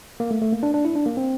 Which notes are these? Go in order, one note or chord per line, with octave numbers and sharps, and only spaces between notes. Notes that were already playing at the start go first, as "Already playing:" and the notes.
A#3
A3
A3
A#3
D4
D4
E4
D4
A#3
C4